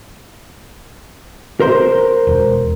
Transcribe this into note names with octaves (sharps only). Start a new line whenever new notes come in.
A#4 C5
E1